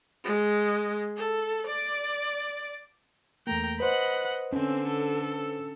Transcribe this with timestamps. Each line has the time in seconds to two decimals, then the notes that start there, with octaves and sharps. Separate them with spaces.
0.24 G#3
1.16 A4
1.66 D5
3.47 E2 A3 A#3 G5 A#5
3.80 B4 C5 D#5 F#5 B5
4.53 D3 C4 C#4
4.88 A4